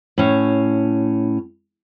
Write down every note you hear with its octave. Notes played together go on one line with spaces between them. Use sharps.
A2 C#4